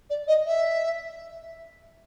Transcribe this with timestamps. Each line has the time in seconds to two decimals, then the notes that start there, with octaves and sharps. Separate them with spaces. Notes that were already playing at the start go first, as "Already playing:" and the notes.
0.10 D5
0.27 D#5
0.46 E5